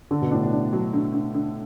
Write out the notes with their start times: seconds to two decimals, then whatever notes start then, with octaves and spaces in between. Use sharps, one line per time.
0.11 D3 A4
0.22 B2
0.31 A2 D4
0.44 B2
0.52 D4
0.73 F#3
0.93 D3
1.13 D3
1.34 D3